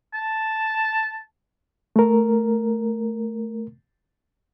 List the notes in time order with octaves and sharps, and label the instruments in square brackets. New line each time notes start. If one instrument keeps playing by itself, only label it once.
[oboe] A5
[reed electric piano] A3 A#4